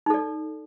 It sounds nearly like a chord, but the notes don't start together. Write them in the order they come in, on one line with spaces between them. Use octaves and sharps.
D#4 A4 D5